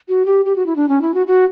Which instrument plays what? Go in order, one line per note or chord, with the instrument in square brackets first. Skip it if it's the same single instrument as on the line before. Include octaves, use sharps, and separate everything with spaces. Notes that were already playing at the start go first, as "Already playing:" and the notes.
[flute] F#4
G4
G4
F#4
E4
D4
C#4
E4
F#4
F#4